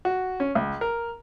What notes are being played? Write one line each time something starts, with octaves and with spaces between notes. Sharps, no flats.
F#4
C#4
C#2
A#4